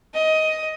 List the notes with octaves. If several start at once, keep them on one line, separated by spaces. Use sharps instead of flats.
D#5